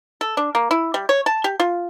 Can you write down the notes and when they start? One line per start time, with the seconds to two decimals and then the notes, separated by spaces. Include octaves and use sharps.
0.21 A4
0.37 D4
0.55 A#3
0.71 E4
0.94 G3
1.09 C#5
1.26 A5
1.44 G4
1.60 F4